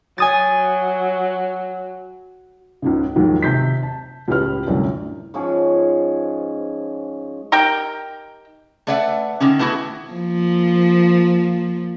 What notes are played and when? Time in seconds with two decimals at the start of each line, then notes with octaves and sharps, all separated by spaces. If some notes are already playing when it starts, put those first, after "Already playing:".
0.18 F#3 G#5 D#6 A6
2.82 C#2 G#2 C#3
3.15 D#2 G#2 F3 F#3
3.43 C3 G6 B6
3.83 A5
4.28 C#2 A2 G4 B4 F6
4.67 C2 F#2 A2 D3 A3
5.34 G#2 F3 C#4 G#4
7.52 D#4 G4 A#4 G5
8.87 A3 B4 D5 E5 F#5
9.40 D3 D#3 C#4
9.59 A3 B3 E4 F#4 G#4
10.10 F3 A#3